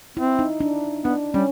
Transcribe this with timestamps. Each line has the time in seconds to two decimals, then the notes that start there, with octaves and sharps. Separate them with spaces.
0.17 C4 E4
0.39 D#4
0.60 D4
1.05 B3 D4
1.34 G3 C#4